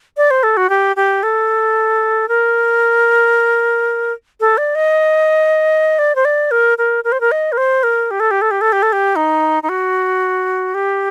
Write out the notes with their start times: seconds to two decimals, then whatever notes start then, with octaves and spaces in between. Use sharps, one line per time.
0.17 D5
0.31 C5
0.43 A4
0.57 F#4
0.69 G4
0.96 G4
1.23 A4
2.28 A#4
4.40 A4
4.58 D5
4.75 D#5
5.99 D5
6.15 C5
6.25 D5
6.51 A#4
6.78 A#4
7.04 A#4
7.12 C5
7.21 A#4
7.31 D#5
7.52 A#4
7.57 C5
7.83 A#4
8.11 G4
8.20 A4
8.31 G4
8.42 A4
8.51 G4
8.61 A4
8.72 G4
8.82 A4
8.92 G4
9.16 D#4
9.63 D#4
9.69 F#4
10.74 G4